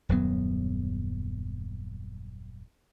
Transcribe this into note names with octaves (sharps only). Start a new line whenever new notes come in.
D#1 F#2 F#3 B3